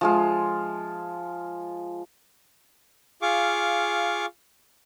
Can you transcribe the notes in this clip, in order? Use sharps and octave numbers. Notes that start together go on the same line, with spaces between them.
F3 G#3 F4
F4 G#4 F5 C#6 D6